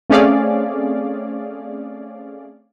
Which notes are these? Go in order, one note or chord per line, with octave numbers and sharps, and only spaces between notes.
A3 C4 C#4 G#4 D5 F5